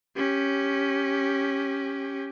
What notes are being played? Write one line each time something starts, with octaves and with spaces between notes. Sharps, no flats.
C#4 G4